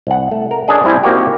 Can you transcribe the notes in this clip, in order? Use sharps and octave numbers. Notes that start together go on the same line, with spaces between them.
C2 F#5
A3
A#4
C#4 D4 G#4 D#5
G3 C4 E4 E5 G#5
A#3 C4 D#4 F#4 G4